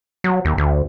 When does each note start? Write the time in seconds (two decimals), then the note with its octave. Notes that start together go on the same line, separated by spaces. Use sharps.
0.24 F#3
0.45 D#2
0.58 D2